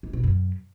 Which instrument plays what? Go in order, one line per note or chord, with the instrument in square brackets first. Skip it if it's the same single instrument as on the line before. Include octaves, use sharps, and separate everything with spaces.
[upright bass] G#2
B2
F#2